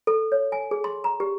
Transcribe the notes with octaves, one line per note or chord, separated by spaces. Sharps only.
A4
C#5
G#5
G#4
C6
A#5
G4